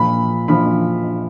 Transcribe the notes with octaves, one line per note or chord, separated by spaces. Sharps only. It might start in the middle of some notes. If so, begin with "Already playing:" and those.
Already playing: A#2 F3 B5
A#2 F3 B5